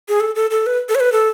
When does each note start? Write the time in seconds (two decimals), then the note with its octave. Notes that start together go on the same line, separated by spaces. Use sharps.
0.09 G#4
0.20 A4
0.35 A4
0.50 A4
0.66 B4
0.89 A4
0.95 C#5
1.00 B4
1.12 A4